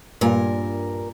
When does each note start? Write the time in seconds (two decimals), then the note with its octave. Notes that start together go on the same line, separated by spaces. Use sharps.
0.21 G2 A#2 A#4